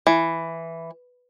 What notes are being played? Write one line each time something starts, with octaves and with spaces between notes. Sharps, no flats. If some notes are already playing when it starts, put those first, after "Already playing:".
E3